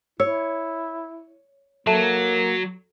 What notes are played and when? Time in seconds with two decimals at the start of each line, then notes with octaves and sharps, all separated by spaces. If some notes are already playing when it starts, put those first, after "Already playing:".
0.20 E4 C#5 E6
1.87 F#3 A#3 A4 E5 A5